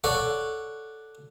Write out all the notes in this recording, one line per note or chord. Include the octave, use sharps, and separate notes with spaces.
A4 C#5 D5 F#5